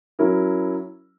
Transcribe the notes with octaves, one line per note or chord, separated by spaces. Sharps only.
F#3 C#4 E4 A#4